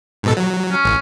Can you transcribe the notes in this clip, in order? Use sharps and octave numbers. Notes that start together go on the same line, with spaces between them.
G#2 B2 A4
F#3
C#4
A1